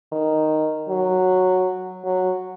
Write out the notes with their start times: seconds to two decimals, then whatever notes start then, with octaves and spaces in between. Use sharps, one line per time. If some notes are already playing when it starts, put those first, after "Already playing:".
0.12 D#3
0.89 F#3
2.04 F#3